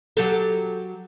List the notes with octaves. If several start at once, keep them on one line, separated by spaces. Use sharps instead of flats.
F#3 G4 A4